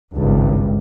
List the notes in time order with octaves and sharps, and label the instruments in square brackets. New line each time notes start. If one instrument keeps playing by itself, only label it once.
[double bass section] G#1 C#2 G2